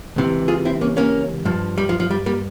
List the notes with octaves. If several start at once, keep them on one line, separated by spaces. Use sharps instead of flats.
C#2 C3 E3
F4 G#4
C4 E4
A#3 C#4
A#3 C#4
G2 F3
G3
F3
F3
G3
G3 A#3